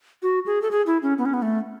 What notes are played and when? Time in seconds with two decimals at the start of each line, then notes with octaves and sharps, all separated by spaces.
0.22 F#4
0.46 G#4
0.62 A4
0.71 G#4
0.87 E4
1.03 C#4
1.18 B3
1.26 C#4
1.34 B3
1.42 A3